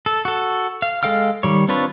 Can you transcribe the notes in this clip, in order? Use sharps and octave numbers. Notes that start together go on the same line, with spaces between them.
A4
F#4 A4
F5
G#3 A4 F5 G5 F6
D#3 G3 C#5
C4 D4 F4 B4 C#5